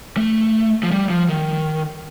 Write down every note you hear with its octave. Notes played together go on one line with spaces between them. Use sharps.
A3
F3
G3
F3
D#3